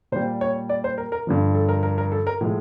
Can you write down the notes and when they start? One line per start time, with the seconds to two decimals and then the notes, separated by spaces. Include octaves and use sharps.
0.12 A#2 G3 C5
0.41 C#5
0.69 D5
0.84 C5
0.98 A#4
1.12 A#4
1.27 G2 D3 F3
1.55 A4
1.69 A#4
1.83 A#4
1.98 A#4
2.12 A4
2.27 A#4
2.41 A2 F3 G#3